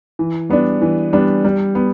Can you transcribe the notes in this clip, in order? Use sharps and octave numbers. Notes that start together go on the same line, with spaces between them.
E3
G3 B3 D4
E3
G3 B3 D4
G3
B3